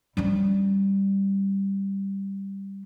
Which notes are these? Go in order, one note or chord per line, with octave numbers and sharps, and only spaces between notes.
G3 C#4